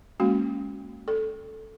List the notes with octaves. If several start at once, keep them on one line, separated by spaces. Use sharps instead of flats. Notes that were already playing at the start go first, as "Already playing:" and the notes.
G#3 A#3 C#4 F#4
A4